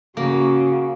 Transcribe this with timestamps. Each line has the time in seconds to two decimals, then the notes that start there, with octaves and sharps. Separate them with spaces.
0.17 C#3 A#3 F#4